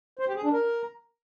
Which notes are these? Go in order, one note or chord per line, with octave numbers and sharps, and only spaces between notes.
C5
G4
G#4
D4
A#4